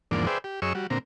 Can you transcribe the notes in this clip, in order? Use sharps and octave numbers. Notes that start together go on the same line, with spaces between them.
E2 G#2 D3 F3 A#3 D5
G#4 B4 C5 D5 E5 G5
G4
F#2 G#4 C#5 D#5 C#6 E6
G3 F#4
A#2 D3 C4 A#5